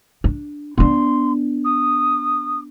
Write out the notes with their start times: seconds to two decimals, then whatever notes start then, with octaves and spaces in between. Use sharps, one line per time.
0.24 D4
0.78 B3 D4 C6
1.64 D#6